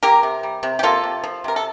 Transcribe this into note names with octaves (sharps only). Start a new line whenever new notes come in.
A#3 G4 A#4
C3
G3
C3
G4
A#3 F4 A4
C3
F3
C3 A#4
A4